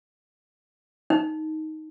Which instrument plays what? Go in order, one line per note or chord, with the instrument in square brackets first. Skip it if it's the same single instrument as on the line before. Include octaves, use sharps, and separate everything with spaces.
[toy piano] D#4